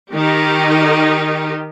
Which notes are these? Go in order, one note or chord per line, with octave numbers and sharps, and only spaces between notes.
D#3 D#4 G4